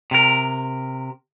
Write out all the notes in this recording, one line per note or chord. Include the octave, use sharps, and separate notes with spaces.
C3 A#4